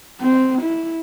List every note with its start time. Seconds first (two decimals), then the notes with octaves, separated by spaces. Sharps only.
0.21 C4
0.62 E4